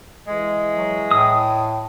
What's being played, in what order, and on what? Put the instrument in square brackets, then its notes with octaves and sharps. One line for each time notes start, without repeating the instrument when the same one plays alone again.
[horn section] E3 G#3
[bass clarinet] F#3
[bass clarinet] A2 [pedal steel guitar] D#6